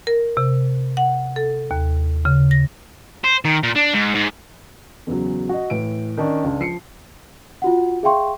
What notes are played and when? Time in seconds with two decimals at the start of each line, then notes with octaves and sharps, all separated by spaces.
0.07 A#4
0.37 C3
0.97 F#5
1.36 A4
1.71 D#2
2.25 C#3
2.51 A#6
3.24 C5
3.45 D#3
3.63 A#2
3.75 D4
3.94 G#2
4.14 G#2
5.07 E2 C#3 F#3
5.49 F#4 D#5
5.70 A2 E3 D7
6.17 D#3 C#4 D4
6.44 C#2 D4
6.60 F3 C7 C#7
7.62 F4 F#4 F#5
8.03 G#4 E5 F5 G5 C6 C#6